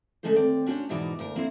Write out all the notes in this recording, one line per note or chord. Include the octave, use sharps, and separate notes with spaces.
D3 G#3 A3 C#4 A4 C5
D#2 C4 D5
C#4 D4 F#4 A#4 C5 C#5
G#2 B2 E3 D#4 F#4 D5
D2 A#2 A#4
A#3 C4 D4 E4 A#4 C5